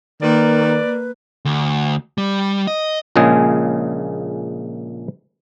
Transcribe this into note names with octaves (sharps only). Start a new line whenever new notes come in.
D#3 A#3 B4 D5
D2
G3
D#5
A#1 A#2 C#3 G#3 G#4